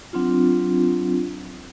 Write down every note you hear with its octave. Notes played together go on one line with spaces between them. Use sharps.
F#3 C4 D4 F4